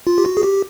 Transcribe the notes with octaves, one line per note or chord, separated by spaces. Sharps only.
F4
G4
F#4
G#4
G4